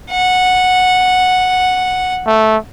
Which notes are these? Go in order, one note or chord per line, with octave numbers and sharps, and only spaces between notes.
F#5
A3